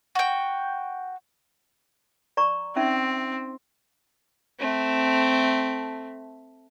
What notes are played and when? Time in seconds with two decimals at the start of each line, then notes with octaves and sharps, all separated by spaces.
0.15 F#4 G5
2.37 D5 A#5 C#6
2.76 C4 C#4 D#4 E5
4.59 A3 C4